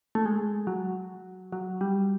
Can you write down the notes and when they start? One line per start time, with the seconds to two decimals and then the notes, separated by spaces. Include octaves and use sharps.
0.15 A3
0.26 G#3
0.67 F#3
1.53 F#3
1.81 G3